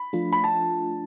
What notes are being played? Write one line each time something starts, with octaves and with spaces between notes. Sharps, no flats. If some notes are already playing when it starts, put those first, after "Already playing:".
Already playing: B5
F3 A3 D4 F4
B5
A5